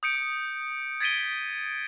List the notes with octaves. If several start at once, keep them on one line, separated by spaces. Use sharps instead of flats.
D#6 G6 C#7 D7
G#6 A6 B6 D7 D#7 G7